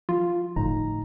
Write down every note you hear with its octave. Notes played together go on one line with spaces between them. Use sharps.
F3 F4
G1 A2 D#4 A#5